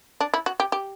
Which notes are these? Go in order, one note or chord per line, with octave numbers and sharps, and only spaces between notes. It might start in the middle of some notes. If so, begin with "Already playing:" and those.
D4
E4
F#4
G4
G4